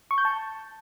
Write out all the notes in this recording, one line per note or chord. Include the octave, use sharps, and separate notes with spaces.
C#6
G6
A5